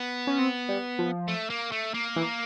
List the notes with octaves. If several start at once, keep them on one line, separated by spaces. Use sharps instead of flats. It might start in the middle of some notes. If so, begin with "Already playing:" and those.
Already playing: B3
C#4
C4
G3
F3
A3
A#3
A3
A#3
E3